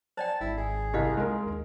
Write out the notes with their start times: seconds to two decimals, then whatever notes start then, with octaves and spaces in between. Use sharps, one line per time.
0.17 C5 D5 G5 A5
0.41 G#1 E4
0.57 G#4
0.94 C2 G4 D#5 F5
1.17 G#3 A#4
1.46 D#2